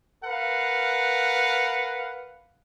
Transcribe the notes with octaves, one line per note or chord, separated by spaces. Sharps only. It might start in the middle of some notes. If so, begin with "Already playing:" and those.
A#4 B4 F5 F#5